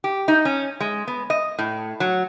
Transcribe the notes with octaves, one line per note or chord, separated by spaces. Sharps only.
G4
D#4
C#4
G#3
B3
D#5
A2
F#3